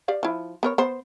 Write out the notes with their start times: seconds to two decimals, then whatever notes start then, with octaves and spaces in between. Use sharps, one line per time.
0.08 G4 D5 F5
0.23 F3 E4
0.63 B3 A#4 C#5
0.78 B3 C5